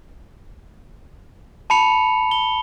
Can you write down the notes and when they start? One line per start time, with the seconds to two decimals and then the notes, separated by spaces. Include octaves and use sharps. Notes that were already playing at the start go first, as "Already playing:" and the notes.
1.70 A5 B5 C#7 F7
2.31 G7